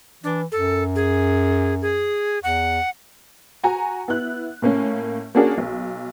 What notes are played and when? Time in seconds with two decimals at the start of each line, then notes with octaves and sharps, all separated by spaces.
0.24 E3 D4
0.52 F#2 A4
0.95 G#4
1.82 G#4
2.43 E2 F#5
3.64 F#4 G#5 A#5
4.08 B3 E4 F#6
4.62 A2 A#3 C#4
5.35 A#3 C#4 D4 F#4 G#4 A#4
5.58 B1